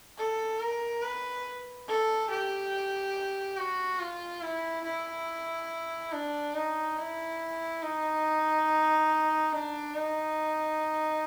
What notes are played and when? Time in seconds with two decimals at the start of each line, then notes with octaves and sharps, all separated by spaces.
0.18 A4
0.60 A#4
1.03 B4
1.88 A4
2.30 G4
3.58 F#4
4.00 F4
4.43 E4
4.85 E4
6.13 D4
6.55 D#4
6.98 E4
7.82 D#4
9.53 D4
9.95 D#4